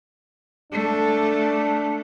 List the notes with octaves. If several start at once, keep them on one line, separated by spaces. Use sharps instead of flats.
A3 D4